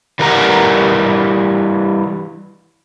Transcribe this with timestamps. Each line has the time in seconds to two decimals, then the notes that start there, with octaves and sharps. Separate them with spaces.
0.19 E3 G3 A#4 F#5 A#5